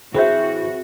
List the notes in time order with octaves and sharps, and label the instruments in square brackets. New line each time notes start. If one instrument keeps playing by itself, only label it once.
[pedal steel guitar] E3 G6 [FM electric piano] C4 B4 [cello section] F#4 [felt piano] G#4 C5 E5